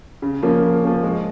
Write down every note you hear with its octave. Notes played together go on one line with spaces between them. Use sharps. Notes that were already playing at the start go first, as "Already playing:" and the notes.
C#3
F3 A#3 C#4
C#3
F3 A#3 C#4
G#3